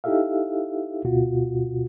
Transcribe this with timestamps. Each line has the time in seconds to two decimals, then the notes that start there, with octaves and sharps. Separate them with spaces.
0.04 D#4 E4 G4 A4 E5 F5
1.04 D2 B2 F4 F#4